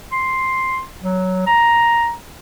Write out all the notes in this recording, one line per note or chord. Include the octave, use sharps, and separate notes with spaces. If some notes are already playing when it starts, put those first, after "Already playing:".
C6
F#3
A#5